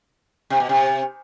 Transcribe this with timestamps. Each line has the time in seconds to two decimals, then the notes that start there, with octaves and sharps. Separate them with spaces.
0.50 C3
0.60 B2
0.69 C3